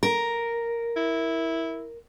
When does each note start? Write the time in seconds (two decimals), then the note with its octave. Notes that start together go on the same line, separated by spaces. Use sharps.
0.03 A#4
0.97 E4